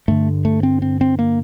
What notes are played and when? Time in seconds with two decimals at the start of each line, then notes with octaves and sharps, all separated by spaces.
0.08 G2 D3 A3
0.45 A3
0.63 C4
0.82 C4
1.01 C4
1.19 A#3